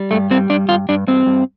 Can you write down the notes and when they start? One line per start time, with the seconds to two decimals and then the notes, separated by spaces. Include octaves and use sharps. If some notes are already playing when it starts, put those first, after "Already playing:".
Already playing: G3
0.11 G2 A3
0.31 G3 C4
0.50 G2 D4
0.68 G2 F4
0.89 G2 D4
1.07 G2 C4
1.26 G2